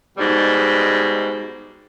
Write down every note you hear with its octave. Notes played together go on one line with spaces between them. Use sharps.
G#2 B2 G3